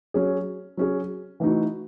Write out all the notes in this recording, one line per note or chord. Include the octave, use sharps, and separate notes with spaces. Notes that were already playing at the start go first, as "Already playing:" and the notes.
F#3 C#4 G#4
F#3 C#4 G#4
E3 A3 D#4 F#4